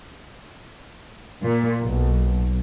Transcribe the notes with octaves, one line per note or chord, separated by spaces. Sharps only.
A#2
B1